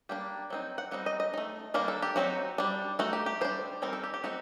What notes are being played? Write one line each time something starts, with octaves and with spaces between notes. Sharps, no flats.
G3 A#3 D4 G5
F#3 C4 D#4
F#5
G3 C4 D#4 F#5
D#5
D#5
A3 D#4
D#3 G3 A#3 D4 A#4
A4
G4
F#3 C4 D#4 F#4
G3 D4
A3 D#4 F#4
G4
G4
G3 D4 C5
D#3 G3 C4 D#4 A#4
A4
G4
G4
A3 C4 D#4 F#4